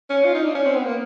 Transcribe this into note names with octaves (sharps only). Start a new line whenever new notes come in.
C#4
F4
D#4
D4
C#4
C4
B3
A#3